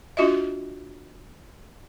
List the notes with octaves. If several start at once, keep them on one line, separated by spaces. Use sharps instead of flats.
D4 F4 F#4 D#5 E5